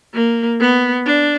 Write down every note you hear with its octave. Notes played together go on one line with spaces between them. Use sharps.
A#3
B3
D4